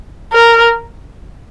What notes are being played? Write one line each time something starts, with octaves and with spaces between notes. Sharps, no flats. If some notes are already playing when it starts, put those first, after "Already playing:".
A#4